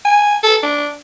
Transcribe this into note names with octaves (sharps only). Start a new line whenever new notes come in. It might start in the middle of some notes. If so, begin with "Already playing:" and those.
G#5
A4
D4